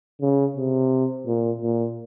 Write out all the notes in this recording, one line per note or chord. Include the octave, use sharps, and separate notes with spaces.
C#3
C3
A#2
A#2